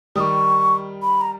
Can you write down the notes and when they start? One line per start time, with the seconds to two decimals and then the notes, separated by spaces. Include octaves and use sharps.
0.16 D#3 G3 C#6 D#6
1.02 B5
1.21 A#5